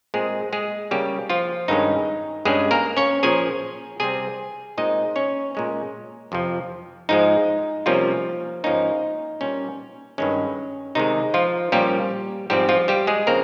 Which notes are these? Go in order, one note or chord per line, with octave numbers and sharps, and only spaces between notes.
A#2 G#3 C4 G#4
G#3 G#4
C#3 G3 A#3 C#4 G4
F3 F4
G2 D#3 G#3 C#4 D#4
G2 G3 G#3 C#4 G#4
A#3 A#4
C#4 C#5
A#2 F3 A#3 C#4 G#4 G#5
C3 G3 C4 G#4 G#5
A#2 G#3 C4 D#4 D#5
C#4 C#5
A#2 G#3 C#4
F2 C3 F3
G#2 F3 G#3 D#4
C3 F3 G3 A#3 C#4 F4
G#2 F3 A#3 C#4 D#4
A#2 G3 C#4
G2 D#3 G#3 C#4
C3 D#3 G#3 D#4
F3 F4
A#2 F3 G3 A#3 C#4 G4
G#2 F3 G3 C4 G4
F3 F4
G3 G4
G#3 G#4
C#3 F3 A#3 C4 A#4